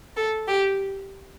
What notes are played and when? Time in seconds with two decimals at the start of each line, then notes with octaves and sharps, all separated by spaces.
0.17 A4
0.48 G4